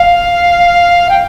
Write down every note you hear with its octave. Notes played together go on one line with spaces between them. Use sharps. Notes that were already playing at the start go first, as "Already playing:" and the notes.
Already playing: F5
G5